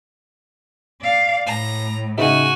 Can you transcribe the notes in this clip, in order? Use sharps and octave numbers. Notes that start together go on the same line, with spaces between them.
D5 F5
A2 A#5
C#3 D#4 F#4 E5 G#5